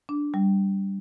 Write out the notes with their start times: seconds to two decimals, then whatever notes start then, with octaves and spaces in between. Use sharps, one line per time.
0.09 D4
0.34 G3